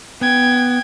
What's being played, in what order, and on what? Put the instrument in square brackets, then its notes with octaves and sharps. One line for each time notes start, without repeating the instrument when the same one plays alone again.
[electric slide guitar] B3 [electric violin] G5 G#6